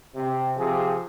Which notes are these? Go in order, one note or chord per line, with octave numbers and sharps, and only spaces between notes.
C3
C3 F3 G#4